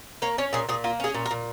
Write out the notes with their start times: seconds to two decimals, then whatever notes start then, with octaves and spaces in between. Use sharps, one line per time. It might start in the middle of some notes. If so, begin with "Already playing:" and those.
0.22 A#3 C#5
0.38 C#4 C#5
0.53 A#2 G#4
0.69 A#2 G#4
0.84 A#3 F4
1.00 C#4 G#4
1.14 A#2
1.26 A#4
1.31 A#2